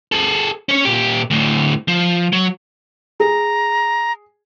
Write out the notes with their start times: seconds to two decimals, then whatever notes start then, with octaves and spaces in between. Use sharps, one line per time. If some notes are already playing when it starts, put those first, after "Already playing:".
0.12 G#4 A4
0.69 C#4 C#5
0.85 A#2 G4
1.30 D2 A2
1.88 F3
2.33 F#3
3.20 G#4 A#5